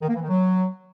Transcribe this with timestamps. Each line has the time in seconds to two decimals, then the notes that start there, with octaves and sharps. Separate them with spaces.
0.01 D#3
0.08 A#3
0.15 E3
0.22 D#3
0.29 F#3